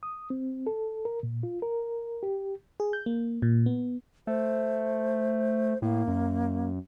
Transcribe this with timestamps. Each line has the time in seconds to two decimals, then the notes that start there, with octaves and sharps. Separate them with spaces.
0.03 D#6
0.30 C4
0.67 A4
1.05 A#4
1.23 A#2
1.43 F4
1.62 A#4
2.23 G4
2.80 G#4
2.93 G6
3.06 A#3
3.42 A#2
3.66 B3
4.27 A3 C5
5.82 A2 A#3
6.08 F#2